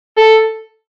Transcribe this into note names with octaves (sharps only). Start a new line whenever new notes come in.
A4